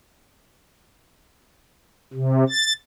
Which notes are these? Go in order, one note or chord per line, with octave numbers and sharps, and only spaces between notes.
C3
A6